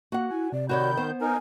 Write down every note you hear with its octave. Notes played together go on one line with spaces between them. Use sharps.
A#3 F#4 F#5
E4 G#5
C3 D5
D#3 F#4 C#5 D5 B5 G6
B3 C5
D#4 A#4 G#5